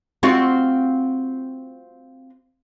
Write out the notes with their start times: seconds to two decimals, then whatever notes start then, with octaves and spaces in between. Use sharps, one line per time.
0.23 C4 F4 F#4